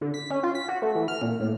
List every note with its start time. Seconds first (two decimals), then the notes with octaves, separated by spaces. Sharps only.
0.01 D3
0.14 B6
0.31 C#4
0.43 F4
0.55 B6
0.68 F#4
0.82 A3
0.95 E3
1.08 F6
1.21 A#2
1.40 A2